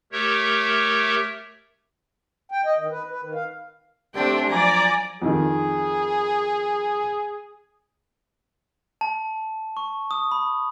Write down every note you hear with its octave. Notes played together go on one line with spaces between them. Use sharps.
A3 G4 A#4 C#5 E5
G5
D#5
D#3
B4
B4
D#3
F5
A3 C4 D4 G4
F3 F#3 D5 G#5 A#5
F2 D#3 G#4
A5
C#6
D#6
B5